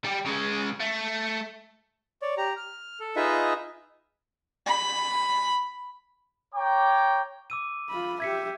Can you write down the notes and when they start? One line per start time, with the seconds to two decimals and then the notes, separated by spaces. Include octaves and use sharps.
0.04 G3 G4
0.26 C#3 G#3
0.80 A3
2.22 C#5 D5
2.37 G4 A#5
2.56 F6
3.00 A4
3.16 D#4 F4 G#4 B4 D#5 E5
4.67 B5
6.54 C#5 G5 A#5 D6
7.50 D6 E6 D#7
7.90 F4 B5
8.20 G4 E5 G#6 B6 C#7